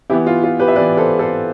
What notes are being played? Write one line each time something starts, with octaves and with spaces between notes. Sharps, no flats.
E3 B3 E4 G4
F4
F4
G4 B4
E5
E3 B3 B4 D5
A4 C5
A4 C5